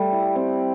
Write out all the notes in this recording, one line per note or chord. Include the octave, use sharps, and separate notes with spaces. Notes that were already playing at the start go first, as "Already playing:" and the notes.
Already playing: G3 A3
E4
C4